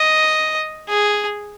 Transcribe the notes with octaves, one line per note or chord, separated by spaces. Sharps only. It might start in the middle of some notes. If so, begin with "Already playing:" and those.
Already playing: D#5
G#4